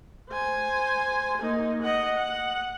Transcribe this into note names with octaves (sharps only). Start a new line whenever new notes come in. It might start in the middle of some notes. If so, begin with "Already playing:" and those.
C5 G#5
A#3 D#4
D#5 F#5
F#5